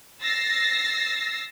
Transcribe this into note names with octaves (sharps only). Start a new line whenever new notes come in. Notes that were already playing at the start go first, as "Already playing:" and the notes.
E6 A6 A#6 C7